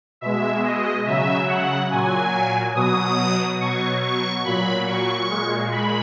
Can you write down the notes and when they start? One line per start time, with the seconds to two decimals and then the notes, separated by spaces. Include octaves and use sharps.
0.21 B2 G#3 E5
0.64 D#5
1.06 C#3 F#3 E5
1.48 F#5
1.91 A#2 F#3 G#5
2.75 B2 F#3 D#6
3.60 B2 F#3 C#6
4.02 C#6
4.44 A#2 F#3 B5
4.87 C#6
5.30 A#2 G#3
5.72 B5